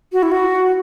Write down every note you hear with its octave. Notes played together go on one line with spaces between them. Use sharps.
F#4
E4
F#4